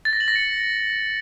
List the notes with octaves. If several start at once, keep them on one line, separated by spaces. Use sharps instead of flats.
A6
A#6
F#7
A#6
C#7